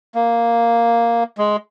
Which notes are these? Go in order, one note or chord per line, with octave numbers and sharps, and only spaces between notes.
A#3
G#3